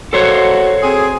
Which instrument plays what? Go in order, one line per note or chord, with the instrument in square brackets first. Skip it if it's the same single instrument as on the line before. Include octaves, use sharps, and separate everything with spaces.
[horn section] F#3 A#3 F#4 [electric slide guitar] A4 C5 C#5
[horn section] C4 G#4